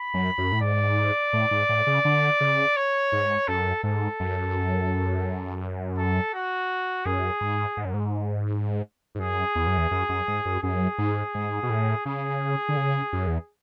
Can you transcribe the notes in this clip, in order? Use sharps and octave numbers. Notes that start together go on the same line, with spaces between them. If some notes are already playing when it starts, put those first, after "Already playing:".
Already playing: B5
F#2
F#2
A2
G#2 D5
A2
G#2
A2
C#3
D3
C#3
C#5
G#2
F#2 A4
G#2 A4
F#2
A4
F#4
F#2 G#4
G#2
G#2
F#2
G#2
G#2
F#2 G#4
E2
F#2
E2
F#2
F#2
G#2
F#2
F#2 G#4
G#2
G#2
B2
A2
C#3 G#4
D3
C#3
F#2
E2